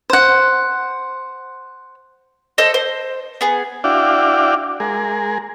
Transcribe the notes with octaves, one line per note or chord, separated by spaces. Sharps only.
C5 F#5
A4 C5 D#5
C5
B3 G#4
D4 E4 F#4 D5 F5 G5
G#3 G#4 A#4